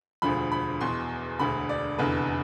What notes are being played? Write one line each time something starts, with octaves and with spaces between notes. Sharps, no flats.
E1 D2 D3 F3 B5
B5
E2 B2 C6
E1 D2 D3 B5
D5
F1 E2 D3 B4